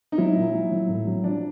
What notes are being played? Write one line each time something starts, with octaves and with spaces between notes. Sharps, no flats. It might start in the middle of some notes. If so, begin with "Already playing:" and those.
D#4
F#3 E4
A#2
F#3
F#3
A2
F#3
F3 D4